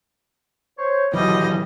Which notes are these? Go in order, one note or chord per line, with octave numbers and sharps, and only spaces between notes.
C5 C#5
D#1 B2 D3 E3 F#3 G3 D#5